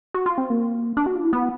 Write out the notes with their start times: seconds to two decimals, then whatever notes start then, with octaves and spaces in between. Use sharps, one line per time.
0.14 F#4
0.26 F4
0.38 C4
0.50 A#3
0.97 D4
1.06 F#4
1.15 F4
1.24 E4
1.33 B3